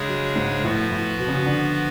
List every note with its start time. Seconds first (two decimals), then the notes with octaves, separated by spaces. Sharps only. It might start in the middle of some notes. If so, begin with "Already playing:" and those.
Already playing: C#3 G#3 D4 G#4 C#5
0.08 F#3
0.36 G#2
0.64 A2 F3 B3 F#4 B4
0.91 A2
1.19 B2
1.28 C#3
1.36 B2
1.46 D3